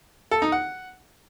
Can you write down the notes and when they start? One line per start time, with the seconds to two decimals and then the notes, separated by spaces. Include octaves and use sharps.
0.31 A4
0.42 D#4
0.52 F#5